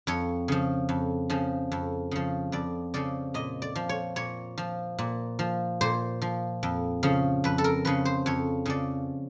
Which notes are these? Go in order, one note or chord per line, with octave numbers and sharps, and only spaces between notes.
F2 C#5
C#3 F3
F2
C#3 F3
F2
C#3 F3
F2 D5
C#3 F3 D5
A#2 D#5
D5
F3
C#5
A#2 C#5
F3
A#2
F3
A#2 C5
F3
F2
C#3 F3
F2 B4
A4
A#4
C#3 F3 B4
C5
F2 C#5
C#3 F3 D5